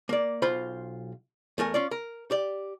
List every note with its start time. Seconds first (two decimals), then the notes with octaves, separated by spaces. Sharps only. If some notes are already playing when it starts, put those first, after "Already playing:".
0.09 A#3 D5
0.42 B1 F4 C5 B5
1.58 E2 A3 A#4 G#5
1.74 C#4 F4 D5
1.91 A#4
2.31 G4 D5